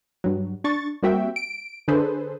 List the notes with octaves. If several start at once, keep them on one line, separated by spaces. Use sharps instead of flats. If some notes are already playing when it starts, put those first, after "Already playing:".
G2 F#3
D4 C#6 A6
G3 A#3 C4 F#4 E5 G5
D7
D3 D4 G#4 A4 B4 C5